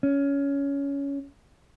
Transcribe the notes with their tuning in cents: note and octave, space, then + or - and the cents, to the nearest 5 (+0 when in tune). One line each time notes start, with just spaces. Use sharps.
C#4 +15